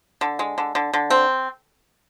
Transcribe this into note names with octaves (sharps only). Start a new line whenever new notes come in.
D3
G#3
D3
D3
D3
C4